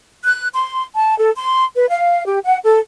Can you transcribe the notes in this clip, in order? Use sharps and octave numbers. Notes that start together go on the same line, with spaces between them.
F#6
C6
A5
A4
C6
B4
F5
G4
F#5
A4